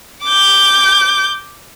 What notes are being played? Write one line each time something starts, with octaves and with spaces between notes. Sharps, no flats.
D6 G6